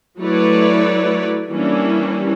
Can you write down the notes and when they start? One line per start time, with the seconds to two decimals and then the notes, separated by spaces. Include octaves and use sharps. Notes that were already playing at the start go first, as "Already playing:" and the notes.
0.19 F#3 A3 E4 B4 C#5 D5
1.50 E3 G3 A#3 C#4 D4 E4